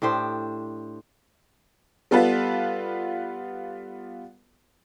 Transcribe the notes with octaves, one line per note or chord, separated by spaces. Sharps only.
A2 D4 G4 C5
G3 B3 F4 A4 B4